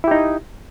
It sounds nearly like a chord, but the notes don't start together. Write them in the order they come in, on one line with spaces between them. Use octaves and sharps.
E4 G4 D#4